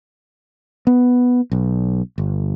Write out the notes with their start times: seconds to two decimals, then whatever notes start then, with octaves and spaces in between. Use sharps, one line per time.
0.87 B3
1.52 B1
2.18 G1